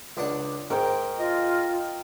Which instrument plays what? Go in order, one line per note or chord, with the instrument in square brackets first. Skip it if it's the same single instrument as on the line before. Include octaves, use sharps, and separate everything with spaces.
[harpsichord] C#2 D4 F#5
[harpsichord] G#2 [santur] A#4 G5
[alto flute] F4 [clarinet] D#5